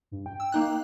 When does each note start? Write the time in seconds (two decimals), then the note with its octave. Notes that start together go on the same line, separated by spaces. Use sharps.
0.11 G2
0.26 G5
0.40 E6
0.52 A#3 D#4 F#6